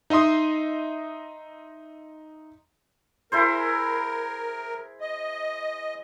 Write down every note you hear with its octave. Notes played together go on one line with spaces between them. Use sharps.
D#4 D#5 E5 C6 D#6
E4 G#4 A#4 C5
D#5